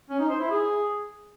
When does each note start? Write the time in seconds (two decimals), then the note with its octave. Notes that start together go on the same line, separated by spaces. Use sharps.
0.10 C#4
0.20 D#4
0.30 C5
0.40 E4
0.50 G#4